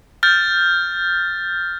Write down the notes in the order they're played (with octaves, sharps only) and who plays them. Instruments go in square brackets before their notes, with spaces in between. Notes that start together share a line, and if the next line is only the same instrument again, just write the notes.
[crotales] F6 G6 A6